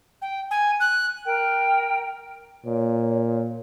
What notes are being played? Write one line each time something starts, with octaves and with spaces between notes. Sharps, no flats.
G5
G#5
F#6
A#4 G5
A#2 C#5